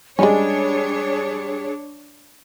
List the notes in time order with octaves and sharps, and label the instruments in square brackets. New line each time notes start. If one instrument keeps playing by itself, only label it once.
[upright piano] G3 [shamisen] G#3 C#4 [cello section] D4 C#5 [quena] G#4